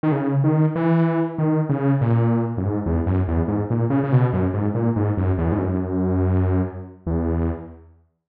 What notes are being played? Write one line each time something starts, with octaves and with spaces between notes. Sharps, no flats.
D#3
C#3
D#3
E3
D#3
C#3
A#2
F#2
G#2
E2
F#2
E2
G#2
A#2
C#3
C#3
B2
F#2
G#2
A#2
G#2
F#2
E2
G#2
F#2
E2